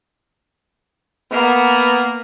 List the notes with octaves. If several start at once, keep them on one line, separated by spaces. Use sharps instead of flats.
A#3 B3